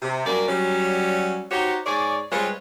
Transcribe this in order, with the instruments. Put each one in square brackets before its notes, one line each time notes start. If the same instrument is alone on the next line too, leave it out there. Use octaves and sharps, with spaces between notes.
[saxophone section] C3
F#2 G3 A#3 D4 D5
F#3 G3 C#4
D#4 F#4 G4 C5 C#5
G#2 G#4 C#5 D5
G3 G#3 C4 F4 B4 C#5